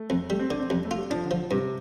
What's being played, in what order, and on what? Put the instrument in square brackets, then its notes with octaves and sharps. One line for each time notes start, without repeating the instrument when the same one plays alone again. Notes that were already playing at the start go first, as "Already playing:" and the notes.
Already playing: [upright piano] A3
[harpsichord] F2
[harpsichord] G3 [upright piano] A3
[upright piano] C4
[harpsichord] D3 [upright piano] D4
[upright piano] C4
[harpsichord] F2 [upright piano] G3
[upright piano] A3
[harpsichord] F4
[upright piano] G3
[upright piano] F3 [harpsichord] D4
[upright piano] D3
[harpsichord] F3
[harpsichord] G2 [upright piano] C3